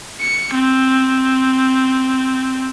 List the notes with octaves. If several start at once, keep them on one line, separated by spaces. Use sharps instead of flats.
C#7
C4